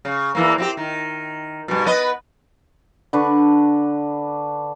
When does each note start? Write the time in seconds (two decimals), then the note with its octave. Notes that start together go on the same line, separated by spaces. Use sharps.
0.05 C#3
0.35 E2 E3 A#3
0.58 C4 E4 G4
0.77 D#3
1.68 G2 B2
1.86 B3 B4 D#5
3.13 D3 D4 B4 C#6